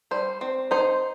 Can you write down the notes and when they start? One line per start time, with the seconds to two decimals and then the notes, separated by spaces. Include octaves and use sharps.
0.11 G3 C5
0.41 C4
0.71 D#4 C5